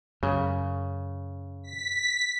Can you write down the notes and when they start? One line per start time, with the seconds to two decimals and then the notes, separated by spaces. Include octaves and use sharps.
0.23 F#2 C#3
1.62 B6